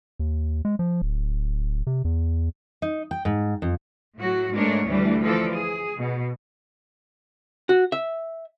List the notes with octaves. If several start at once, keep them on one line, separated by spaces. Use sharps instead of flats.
D#2
G#3
F3
D1
C3
E2
D#4
G5
G#2
F2
A2 F#3 F#4
G#2 G#3 A3 D4 A#4 C#5
D2 E3 G3 A3 D4
E3 F3 A4 D5
G#4
B2
F#4
E5